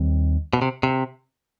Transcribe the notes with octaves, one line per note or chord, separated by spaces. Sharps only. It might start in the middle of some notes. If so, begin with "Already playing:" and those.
Already playing: D#2 D#3 G3 C4
B2
C3
C3